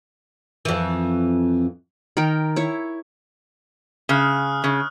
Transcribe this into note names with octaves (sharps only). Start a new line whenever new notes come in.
F2 E3
D#3 A#4 G5
E4 C#5
C#3 D#6 F6 F#6
C#3